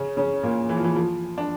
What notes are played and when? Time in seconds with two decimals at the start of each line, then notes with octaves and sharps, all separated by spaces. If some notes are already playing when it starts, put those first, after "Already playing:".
Already playing: C#3 C#4
0.17 C#3 C#4
0.43 A#2 A#3
0.69 E3
0.77 F3
0.84 E3
0.96 F3
1.38 D4